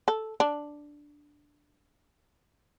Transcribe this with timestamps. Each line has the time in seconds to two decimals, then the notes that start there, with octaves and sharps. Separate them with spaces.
0.08 A4
0.40 D4